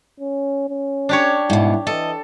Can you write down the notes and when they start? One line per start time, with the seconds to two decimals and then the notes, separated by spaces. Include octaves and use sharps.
0.20 C#4
0.69 C#4
1.09 D4 G4 C#5
1.50 G#2 B2 E4
1.87 E3 A4 D#5